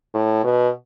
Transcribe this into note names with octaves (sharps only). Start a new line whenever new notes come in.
A2
B2